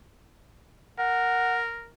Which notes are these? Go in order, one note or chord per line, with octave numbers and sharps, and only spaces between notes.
A#4 F#5